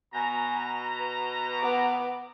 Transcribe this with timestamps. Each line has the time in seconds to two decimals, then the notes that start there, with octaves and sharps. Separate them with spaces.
0.14 B2 G#5 A#5
0.97 B4
1.60 B3 D6